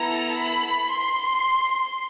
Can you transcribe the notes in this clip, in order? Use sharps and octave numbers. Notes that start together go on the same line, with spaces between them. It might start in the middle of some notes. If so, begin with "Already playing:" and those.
Already playing: B3 E4 A4 A#5
B5
C6